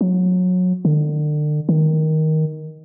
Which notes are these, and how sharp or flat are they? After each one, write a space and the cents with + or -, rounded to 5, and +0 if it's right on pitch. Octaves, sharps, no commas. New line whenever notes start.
F#3 -25
D3 +40
D#3 +10